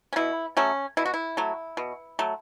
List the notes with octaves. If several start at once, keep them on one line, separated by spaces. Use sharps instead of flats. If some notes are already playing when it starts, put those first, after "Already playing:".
C#4
B2 E4
F#3 A3 C#4
B2 E4
F#4
E4
F#3 A3
B2
F#3 A3